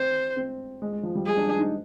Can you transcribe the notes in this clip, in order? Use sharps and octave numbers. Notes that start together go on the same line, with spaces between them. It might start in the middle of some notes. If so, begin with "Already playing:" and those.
Already playing: C4 C5
C4
G#3
G#3
F3
G3
G#3 G#4
D4
D4
D#4